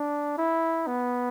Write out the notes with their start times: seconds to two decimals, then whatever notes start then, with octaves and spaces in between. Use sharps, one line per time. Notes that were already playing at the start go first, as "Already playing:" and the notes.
Already playing: D4
0.38 E4
0.87 B3